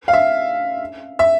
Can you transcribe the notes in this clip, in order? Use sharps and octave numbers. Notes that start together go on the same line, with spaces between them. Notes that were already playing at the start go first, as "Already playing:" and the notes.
F5
E5
E5